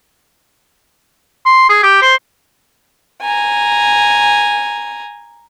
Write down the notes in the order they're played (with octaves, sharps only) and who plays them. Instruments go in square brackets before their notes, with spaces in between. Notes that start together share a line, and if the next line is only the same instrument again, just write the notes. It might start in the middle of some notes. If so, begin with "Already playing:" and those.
[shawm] C6
G#4
G4
C5
[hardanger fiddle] G#5 A#5